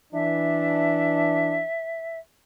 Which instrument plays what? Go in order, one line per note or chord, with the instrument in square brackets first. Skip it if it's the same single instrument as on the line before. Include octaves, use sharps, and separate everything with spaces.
[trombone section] E3 D4 [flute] E5